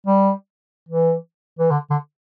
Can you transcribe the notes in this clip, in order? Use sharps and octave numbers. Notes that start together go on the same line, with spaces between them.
G3
E3
E3
D3
D3